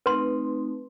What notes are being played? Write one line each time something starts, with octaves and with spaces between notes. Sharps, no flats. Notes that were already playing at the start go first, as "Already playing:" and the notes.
A3 C4 D#4 B4 C6